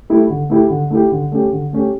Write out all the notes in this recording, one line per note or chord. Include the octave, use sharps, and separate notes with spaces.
A3 E4 G4
D3
A3 E4 G4
D3
A3 E4 G4
D3
A3 C#4 G4
D3
A3 C#4 G4